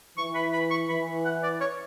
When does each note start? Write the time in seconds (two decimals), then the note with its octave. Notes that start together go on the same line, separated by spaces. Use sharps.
0.18 E3 C#6
0.35 B5
0.53 B5
0.71 C#6
0.89 E3 B5
1.25 F#5
1.43 D5
1.60 C#5